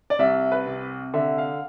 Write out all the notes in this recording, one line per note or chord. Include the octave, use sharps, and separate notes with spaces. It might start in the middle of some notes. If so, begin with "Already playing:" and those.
D5
C2 E5
B4
C3
D3 E5
F5